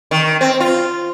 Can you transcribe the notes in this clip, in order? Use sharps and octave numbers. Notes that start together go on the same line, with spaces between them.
D#3
C4
F4